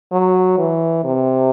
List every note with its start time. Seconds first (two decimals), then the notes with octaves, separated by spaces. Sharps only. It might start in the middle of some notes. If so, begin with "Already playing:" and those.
0.12 F#3
0.58 E3
1.04 C3